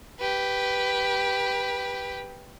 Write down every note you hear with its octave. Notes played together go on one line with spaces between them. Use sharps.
G4 B4